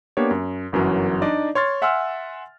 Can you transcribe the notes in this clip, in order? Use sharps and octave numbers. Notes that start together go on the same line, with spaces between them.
A#3 B3 D4 G4 C#5
F#2
G1 F#2 E3 F#3 A#4
D4 D#4 D5 D#5
C#5 C6 F6 A6
E5 F#5 G#5 C6 E6 F6